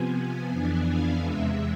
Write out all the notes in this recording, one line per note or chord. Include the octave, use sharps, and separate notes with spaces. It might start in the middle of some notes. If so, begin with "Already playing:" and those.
Already playing: C3 F3 B3 G#5
F2 E3 B3 D4
F5
E2 C3 E3 G#3 E5